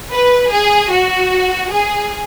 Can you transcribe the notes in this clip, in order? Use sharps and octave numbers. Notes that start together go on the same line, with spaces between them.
B4
G#4
F#4
G#4